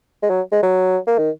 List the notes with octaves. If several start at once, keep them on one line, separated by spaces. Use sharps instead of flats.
G#3
F#3
G#3
F#3
A#3
D#3